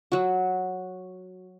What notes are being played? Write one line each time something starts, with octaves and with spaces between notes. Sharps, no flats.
F#3 F#4